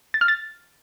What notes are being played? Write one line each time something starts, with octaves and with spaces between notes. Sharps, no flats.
A6
F6
A6